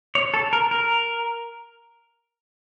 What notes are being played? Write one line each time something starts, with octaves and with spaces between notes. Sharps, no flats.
C#5
A4
A#4
A#4